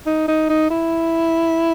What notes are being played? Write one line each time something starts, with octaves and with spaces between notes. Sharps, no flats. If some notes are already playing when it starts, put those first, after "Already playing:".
D#4
D#4
D#4
E4